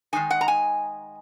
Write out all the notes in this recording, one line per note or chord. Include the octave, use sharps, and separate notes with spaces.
D#3 G#3 D#4 G#5
F#5
A#5
G#5